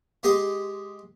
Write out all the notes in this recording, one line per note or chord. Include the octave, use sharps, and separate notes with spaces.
G#3 G4 D#5 G5 C6 D6